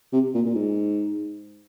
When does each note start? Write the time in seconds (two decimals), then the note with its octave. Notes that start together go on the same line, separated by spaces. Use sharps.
0.12 C3
0.34 A#2
0.46 A#2
0.55 G#2